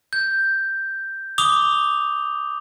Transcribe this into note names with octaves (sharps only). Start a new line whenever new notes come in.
G6
D6 D#6 F7 G7